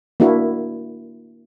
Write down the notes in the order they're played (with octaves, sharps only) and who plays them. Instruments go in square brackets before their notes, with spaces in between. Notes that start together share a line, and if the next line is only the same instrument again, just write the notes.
[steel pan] A#3 D4 E4 F#4 A#4